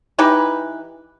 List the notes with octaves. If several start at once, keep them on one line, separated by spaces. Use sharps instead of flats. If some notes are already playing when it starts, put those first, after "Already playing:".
E3 D#4 G4 B4